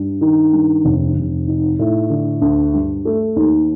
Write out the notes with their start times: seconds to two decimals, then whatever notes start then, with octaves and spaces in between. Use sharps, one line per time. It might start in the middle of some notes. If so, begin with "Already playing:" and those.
Already playing: G2
0.21 D#3
0.53 G2
0.84 F1
1.16 F1
1.48 D#4
1.79 A2
2.10 D3
2.42 D2
2.74 G2
3.05 A3
3.36 D#2